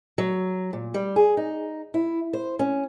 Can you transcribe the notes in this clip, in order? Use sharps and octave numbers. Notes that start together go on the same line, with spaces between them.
F#3
A#2
G3
G#4
D#4
E4
C5
C#4